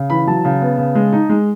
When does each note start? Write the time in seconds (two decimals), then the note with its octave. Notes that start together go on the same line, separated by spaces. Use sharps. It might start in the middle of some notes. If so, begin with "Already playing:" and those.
Already playing: C#3
0.10 E3 B5
0.27 F#3 A5
0.45 C#3
0.61 B3
0.78 C#3
0.95 G#3
1.12 D#4
1.29 G#3